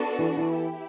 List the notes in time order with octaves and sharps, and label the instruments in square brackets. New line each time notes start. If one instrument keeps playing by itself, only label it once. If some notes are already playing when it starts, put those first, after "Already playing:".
Already playing: [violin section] B3 D4 F#4 A4
[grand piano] E3
E3
[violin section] E4 G4